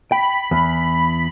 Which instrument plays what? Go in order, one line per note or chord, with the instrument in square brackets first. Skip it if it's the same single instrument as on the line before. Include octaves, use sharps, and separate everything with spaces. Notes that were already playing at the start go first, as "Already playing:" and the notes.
[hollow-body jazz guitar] G5 [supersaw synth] B5
[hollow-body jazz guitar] E2